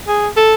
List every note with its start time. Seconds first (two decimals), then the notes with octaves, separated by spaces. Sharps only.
0.08 G#4
0.37 A4